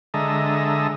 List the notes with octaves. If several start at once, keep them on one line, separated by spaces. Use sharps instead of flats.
D3 G#3 A4 D#5 E5 A#5